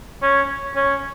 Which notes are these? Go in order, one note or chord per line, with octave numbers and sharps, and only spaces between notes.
C#4
C#4